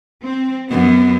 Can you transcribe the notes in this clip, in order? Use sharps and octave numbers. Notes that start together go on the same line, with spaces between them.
C4
F#2 B3